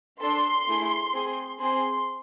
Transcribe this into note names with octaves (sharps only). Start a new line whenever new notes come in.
D4 A4 C6
A3 E4 G#4
C4 G#4
C4 G#4 C6